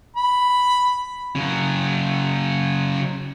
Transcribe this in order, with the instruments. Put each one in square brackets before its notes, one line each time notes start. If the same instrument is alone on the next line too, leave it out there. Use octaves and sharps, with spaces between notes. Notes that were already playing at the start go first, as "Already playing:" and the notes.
[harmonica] B5
[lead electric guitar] C#3 F#3